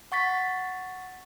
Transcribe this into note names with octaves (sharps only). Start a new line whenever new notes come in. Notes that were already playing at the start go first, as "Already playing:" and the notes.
F#5 C#6 A6 B6